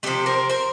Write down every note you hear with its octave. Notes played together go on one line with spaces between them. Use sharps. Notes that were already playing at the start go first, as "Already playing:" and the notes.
C3 F3 A3 G4 A4
A#4 C5
A#4 C5